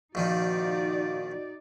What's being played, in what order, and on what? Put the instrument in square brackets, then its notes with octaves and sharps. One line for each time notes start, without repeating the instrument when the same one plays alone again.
[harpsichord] A#1 D#3 F3 [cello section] D#4 D5 [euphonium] F#4